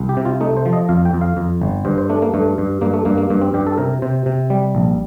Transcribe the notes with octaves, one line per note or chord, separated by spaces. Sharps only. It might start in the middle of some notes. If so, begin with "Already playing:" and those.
Already playing: C2
G4
C3
F4
A3 D#4
C5
F3
D#5
F2 F5
G5
F2
F5
F2
G1
G2 C5
C5
A3 D4
A#3
G2 A3
G2
G2 A#3
A3
G2 A#3
A#3
G2 A#3
C4
G2 G4
A4
C3 A#4
C3 C5
C3
G3
A#1